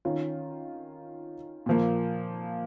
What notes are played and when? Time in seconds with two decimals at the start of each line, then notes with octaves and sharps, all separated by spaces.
0.05 D#3 C#4 F4
1.66 A#2 F3 A#3